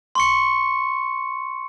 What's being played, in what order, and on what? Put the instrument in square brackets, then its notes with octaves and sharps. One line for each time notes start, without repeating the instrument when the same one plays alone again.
[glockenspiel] C6 C#6 C#7